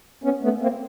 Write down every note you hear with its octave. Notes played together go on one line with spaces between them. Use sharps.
B3 C#4
A3 B3
A#3 C4